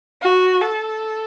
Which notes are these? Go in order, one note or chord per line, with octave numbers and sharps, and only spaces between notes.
F#4
A4